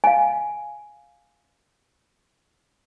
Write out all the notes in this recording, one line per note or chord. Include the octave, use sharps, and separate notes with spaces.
F5 G#5